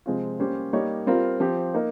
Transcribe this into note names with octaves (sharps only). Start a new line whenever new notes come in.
C3 F3 G#3 C4 F4
G3 A#3 C#4 G4 C5
G3 A#3 D#4 G4 C#5
G3 C4 F4 A#4
F3 C4 G4
A#3 D#4 A#4